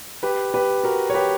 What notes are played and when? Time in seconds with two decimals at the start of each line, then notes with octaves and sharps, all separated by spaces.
0.23 G4 B4
0.54 G4 B4
0.84 F#4 A#4
1.10 C#5
1.14 G4 B4